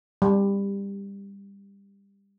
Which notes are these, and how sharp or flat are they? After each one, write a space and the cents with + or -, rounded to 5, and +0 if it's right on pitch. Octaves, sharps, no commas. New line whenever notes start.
G3 +20